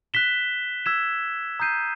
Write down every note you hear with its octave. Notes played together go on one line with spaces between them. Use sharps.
F#6 B6 E7 G7
E6 G#6 B6 E7
A#5 D#6 G6 C7 D#7